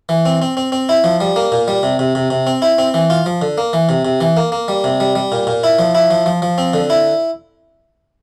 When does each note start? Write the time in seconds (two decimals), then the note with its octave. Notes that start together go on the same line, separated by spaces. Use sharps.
0.09 E3
0.26 C4
0.42 C4
0.57 C4
0.72 C4
0.89 E4
1.04 F3
1.21 G3
1.36 A#3
1.52 A#2
1.68 G3
1.83 C3
1.99 C3
2.15 C3
2.30 C3
2.47 C4
2.62 E4
2.78 C4
2.94 E3
3.10 F4
3.26 F3
3.42 D3
3.58 A#3
3.73 E3
3.89 C3
4.05 C3
4.21 E3
4.37 A#3
4.52 A#3
4.68 G3
4.84 C3
5.00 G3
5.15 G3
5.32 A#2
5.47 A#2
5.64 E4
5.79 F3
5.95 E4
6.11 F3
6.26 F3
6.42 F3
6.58 C4
6.74 D3
6.90 E4